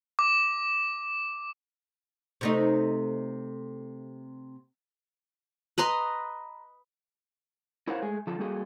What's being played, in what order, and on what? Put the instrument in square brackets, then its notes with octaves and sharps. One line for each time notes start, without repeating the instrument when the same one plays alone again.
[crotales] D6
[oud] C3 A3 D#4
[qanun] B4 D#5 A#5 C6
[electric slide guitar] E4 A#4 C5 C#5 F5 F#5
G#3 A3 G#4
D3 F3 F4 A4
G3 A#3 F#4 G#4 A4